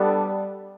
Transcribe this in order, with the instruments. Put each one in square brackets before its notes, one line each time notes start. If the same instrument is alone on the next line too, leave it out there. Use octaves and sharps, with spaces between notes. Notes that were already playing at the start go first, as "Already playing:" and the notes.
Already playing: [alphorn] G3 [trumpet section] B3 D4 A4 D5